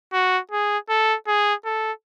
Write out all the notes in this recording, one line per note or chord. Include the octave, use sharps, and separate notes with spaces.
F#4
G#4
A4
G#4
A4